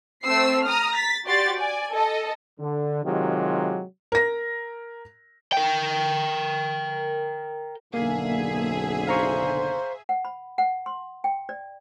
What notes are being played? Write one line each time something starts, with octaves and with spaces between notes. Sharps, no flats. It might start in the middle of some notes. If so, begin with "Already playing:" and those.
A3 C4 E6 C7
A#5 D#6 F6
A6 B6
F#4 G4 D5 C6 A6
D5 G#5
A4 D#5
D3
C3 D#3 F#3 G#3 F4 G4
A#4 A#6
A#4 G5
F#1 B1 D3 A#3 G#4 E5
C5 F5 A#5 C#6
F#5
B5
F#5
C6
G5
D5